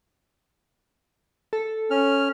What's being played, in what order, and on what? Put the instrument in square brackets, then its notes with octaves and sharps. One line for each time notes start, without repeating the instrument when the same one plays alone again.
[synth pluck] A4
[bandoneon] C#4 F6